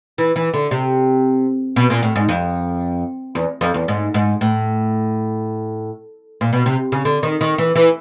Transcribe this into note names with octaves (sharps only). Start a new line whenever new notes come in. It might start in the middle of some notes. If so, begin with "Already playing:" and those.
E3
E3
D3
C3
B2
A#2
A2
G#2
F2
E2
F2
E2
G#2
G#2
A2
A#2
B2
C3
C#3
D3
D#3
D#3
E3
E3